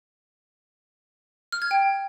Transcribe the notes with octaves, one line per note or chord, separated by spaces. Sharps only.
F6
G#6
G5